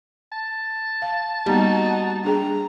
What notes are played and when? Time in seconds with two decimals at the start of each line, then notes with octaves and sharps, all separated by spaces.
0.32 A5
1.02 F5
1.46 G3 A#3 B3 D#4 F#4
2.24 D4 G#4 G5 A#5